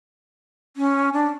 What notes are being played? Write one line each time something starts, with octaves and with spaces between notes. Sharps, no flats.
C#4
D4